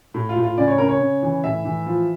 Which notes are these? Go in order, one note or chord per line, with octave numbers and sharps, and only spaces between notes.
A2
F4
A2
F4
C#3 D5
C#5
C#3 A#4
C#5
C#3
E3
A2 E5
E3
F3